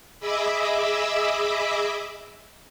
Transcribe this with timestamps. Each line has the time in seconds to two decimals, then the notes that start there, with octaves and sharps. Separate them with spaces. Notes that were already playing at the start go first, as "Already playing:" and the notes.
0.20 G#4 D#5 E5 B5 D6 E6